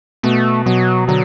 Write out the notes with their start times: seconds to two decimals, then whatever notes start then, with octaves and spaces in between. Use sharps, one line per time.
0.23 B2 A3
0.66 B2 F#3
1.08 D3 F#3